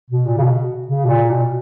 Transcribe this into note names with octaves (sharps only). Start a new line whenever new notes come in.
B2
A#2
C#3
B2
C#3
B2
A#2
B2